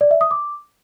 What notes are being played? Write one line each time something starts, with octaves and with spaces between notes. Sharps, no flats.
D5
E5
D#6
D6